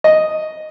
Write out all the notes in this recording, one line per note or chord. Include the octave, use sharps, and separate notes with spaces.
D#5